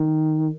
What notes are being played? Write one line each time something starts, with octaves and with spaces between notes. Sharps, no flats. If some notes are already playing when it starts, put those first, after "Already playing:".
Already playing: D#3